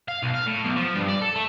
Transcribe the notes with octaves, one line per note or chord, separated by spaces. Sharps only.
F5
B1
F5
A2
B1
F3
G2
D5
A4
A3